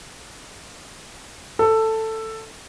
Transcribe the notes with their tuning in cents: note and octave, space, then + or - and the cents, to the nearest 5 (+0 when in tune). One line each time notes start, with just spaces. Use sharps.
A4 +10